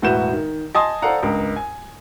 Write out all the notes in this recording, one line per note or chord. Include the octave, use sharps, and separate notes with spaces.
E1 A2 F#4 B4 G6 E7
D#3
D#5 G#5 A5 C6 D#6
A4 C5 D5 F5 F#5 A#5
C#2 G2 A#4
G#5